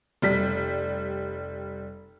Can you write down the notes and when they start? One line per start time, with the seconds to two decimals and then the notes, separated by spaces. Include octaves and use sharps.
0.22 F1 G3 B6